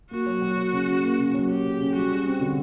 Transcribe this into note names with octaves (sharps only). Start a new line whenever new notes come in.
A#3 F#4
F#3
F#3
F#3
C#3
C#3
A#3
C#3
F#3
C#3 G4
C#3
C#3
G3 F#4
G3
C4
D3